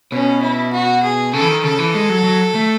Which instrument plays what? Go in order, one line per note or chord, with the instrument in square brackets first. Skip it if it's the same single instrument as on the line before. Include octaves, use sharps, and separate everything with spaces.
[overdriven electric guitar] B2 [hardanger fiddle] C#4
[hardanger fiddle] E4
F#4
G#4
[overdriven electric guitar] C#3 [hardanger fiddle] A4
[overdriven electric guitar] E3
D#3
[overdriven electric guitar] C#3 [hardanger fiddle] A4
[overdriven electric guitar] E3
G#3
F#3
F#3
A3